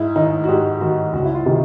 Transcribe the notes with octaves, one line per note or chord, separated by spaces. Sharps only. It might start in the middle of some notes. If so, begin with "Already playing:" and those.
Already playing: G#2 E4
D#3 D#4
F#4
G#2 G4
D#3 F#4
C#2 F#4
E4
F4
C3 D#3